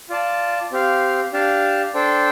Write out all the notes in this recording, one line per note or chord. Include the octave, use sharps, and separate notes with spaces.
F4 D5 A5
C4 G4 F5
D4 G4 F5 A5
D4 A4 C5 G5